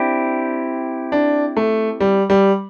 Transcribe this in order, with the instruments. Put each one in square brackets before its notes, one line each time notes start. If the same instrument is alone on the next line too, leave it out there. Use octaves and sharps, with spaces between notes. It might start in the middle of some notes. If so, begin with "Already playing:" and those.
Already playing: [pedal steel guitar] C4 E4 G4 [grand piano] D4
[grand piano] D4
A3
G3
G3